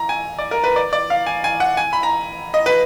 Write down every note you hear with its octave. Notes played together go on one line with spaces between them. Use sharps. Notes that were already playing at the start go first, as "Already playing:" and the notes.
Already playing: A#5
G#5
D5
A#4
B4
D5
D5
F5
G#5
G#5
F#5
G#5
B5
A#5
D#5
B4